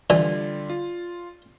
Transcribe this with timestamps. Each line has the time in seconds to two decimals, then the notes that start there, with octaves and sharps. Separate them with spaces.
0.10 D3 E3 G3 F4 D5
0.70 F4